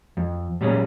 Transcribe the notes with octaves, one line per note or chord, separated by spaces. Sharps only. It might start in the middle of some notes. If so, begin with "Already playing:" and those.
F2
A#2 F#3 G3 C#4 G#4